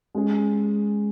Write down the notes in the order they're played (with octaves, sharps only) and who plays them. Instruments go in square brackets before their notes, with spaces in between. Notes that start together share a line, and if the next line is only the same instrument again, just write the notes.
[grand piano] G#3 C#4 G#4